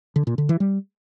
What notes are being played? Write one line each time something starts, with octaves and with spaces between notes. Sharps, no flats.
D3
A#2
D3
E3
G3